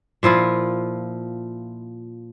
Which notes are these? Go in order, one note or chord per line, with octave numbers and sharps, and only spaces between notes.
A#2 F3 E4 F4